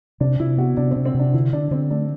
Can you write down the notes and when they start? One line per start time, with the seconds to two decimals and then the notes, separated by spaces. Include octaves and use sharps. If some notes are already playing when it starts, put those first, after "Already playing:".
0.20 C3 D4
0.40 C3 E4
0.58 B3 F#4
0.77 C3 D4
0.91 C4
0.96 C3
1.05 C4
1.14 C3 D4
1.34 D3 E4
1.53 D3 D4
1.71 D3 C4
1.90 A3 D4